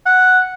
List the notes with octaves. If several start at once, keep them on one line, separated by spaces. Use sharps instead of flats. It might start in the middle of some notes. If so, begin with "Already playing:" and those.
F#5